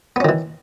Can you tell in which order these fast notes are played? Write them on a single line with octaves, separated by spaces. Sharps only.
B3 C#4 D#3 E3